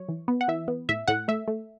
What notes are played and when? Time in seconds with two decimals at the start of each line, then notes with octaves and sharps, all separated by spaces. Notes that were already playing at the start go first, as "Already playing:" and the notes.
Already playing: F#3 C#5
0.08 E3
0.28 B3
0.41 F#5
0.48 E3 E5
0.68 B3
0.89 A2 E5
1.08 A2 F#5
1.28 A3 E5
1.48 A3